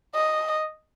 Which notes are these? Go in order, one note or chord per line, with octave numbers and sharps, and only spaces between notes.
D#5